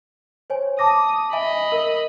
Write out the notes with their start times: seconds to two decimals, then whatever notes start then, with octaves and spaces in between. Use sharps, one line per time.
0.50 C5 C#5 G#5
0.79 A5 D6 D#6 A#6
1.33 D#5 E5 G#5 B5
1.72 A#4